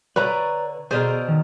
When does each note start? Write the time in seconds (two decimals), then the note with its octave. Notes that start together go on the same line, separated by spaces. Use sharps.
0.16 D3 B4 C#5 D5 A#5
0.91 B2 D3 G#4 A#4 C5
1.28 D#3